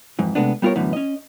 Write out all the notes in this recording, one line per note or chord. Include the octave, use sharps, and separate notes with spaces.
F2 G#2 E3
C3 D#3 G#3 A3 B3 D4
G3 B3 F4 F#4 A#4 C#5
F#2 A2 D3 E3 B3
C#4 D#5